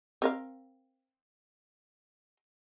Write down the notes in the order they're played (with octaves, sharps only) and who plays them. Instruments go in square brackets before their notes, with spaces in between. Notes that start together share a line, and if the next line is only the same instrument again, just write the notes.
[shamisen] C4 A#4 F5